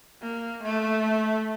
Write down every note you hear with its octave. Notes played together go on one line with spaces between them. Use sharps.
A#3
A3